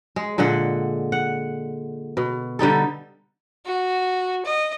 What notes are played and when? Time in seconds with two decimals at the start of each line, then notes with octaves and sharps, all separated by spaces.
0.16 G#3
0.38 A#2 D3 G#3 F#5
1.12 F#5
2.17 B2
2.59 D3 G3 D#4 A4
3.65 F#4
4.45 D#5